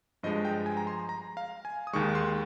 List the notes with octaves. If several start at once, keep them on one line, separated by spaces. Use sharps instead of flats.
G2 F3 G#3 D#5
G5
G#5
A#5
C6
A#5
F5
G#5
D#6
D#2 D#3 G#3 C#6
C#6
C6